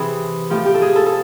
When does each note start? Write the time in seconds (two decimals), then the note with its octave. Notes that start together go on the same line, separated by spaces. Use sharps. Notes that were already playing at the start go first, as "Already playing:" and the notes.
Already playing: C3 E3 G#4
0.50 A2 F3 G4
0.66 G4
0.74 A4
0.81 G#4
0.96 A4
1.06 A4